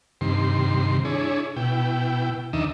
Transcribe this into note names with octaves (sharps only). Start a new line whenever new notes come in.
G2 C3 D#3 C6
D4 E4 G#4 C#5
B2 E4 G5
D#2 D#3 D4 D#5 E5